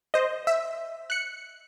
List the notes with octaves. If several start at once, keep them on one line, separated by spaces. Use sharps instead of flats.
C5 D#5
E5
F#6 C#7